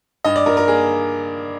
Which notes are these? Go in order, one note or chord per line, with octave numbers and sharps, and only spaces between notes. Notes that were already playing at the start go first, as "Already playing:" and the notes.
G2 D#5
D5
G2 A#4
A#4
A#3 G#4